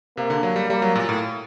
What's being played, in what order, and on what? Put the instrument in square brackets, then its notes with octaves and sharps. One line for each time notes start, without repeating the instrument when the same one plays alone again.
[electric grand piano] C3 [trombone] A#3
[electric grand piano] D3
F#3
G3
[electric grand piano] G3 [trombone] A#3
[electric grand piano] F#3
A#2
A2